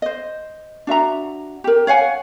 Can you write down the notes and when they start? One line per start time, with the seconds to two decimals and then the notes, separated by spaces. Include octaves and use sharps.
0.02 C5 D#5
0.87 D4 F#4 E5 A#5
1.64 G4 A#4
1.87 C#5 F5 F#5 G#5